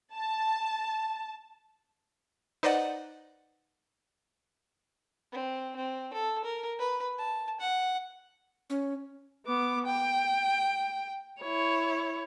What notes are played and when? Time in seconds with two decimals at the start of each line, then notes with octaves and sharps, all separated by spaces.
0.14 A5
2.63 D#4 B4 C5 D5 D#5 F#5
5.32 C4
5.76 C4
6.14 A4
6.44 A#4
6.79 B4
7.18 A5
7.60 F#5
8.70 C#4
9.46 B3 D6
9.86 G5
11.41 E4 C#5